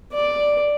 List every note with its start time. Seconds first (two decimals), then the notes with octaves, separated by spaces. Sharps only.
0.12 D5